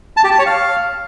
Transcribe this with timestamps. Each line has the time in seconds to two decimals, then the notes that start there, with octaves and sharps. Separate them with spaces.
0.17 A5
0.24 G4
0.31 A5
0.39 C#5
0.46 F5